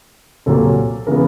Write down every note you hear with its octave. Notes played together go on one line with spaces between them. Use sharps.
C2 A#2 F#3 A#3 A4
C#3 E3 G#3 B3 A#4